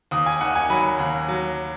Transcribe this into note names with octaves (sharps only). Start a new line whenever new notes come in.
D#2 D#6
G#5
D#3 F#5
G#5
F#3 B5
D#2
F#3